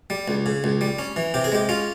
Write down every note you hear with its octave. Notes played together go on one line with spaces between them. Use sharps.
G3
C#2
C#3
C#2
G3
C#4
E3
C3 G4
G#4
G#3 G4
C#4 F4